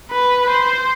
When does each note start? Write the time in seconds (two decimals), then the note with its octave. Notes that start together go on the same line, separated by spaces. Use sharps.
0.12 B4
0.50 C5